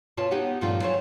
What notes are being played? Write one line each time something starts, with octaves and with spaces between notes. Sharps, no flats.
B2 F4 C#5 A5
B3 D#4 G4 C#5 F#5
G2 A#2 D#3 F3 A3 F4
E3 F#3 F4 C5 C#5